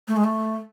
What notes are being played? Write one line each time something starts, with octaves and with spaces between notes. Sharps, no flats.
A3
G#3
A3